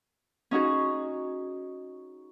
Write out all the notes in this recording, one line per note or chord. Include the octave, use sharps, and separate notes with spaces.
C#4 D#4 F#4 G#4